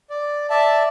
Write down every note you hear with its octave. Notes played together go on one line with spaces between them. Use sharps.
D5
D5 E5 A5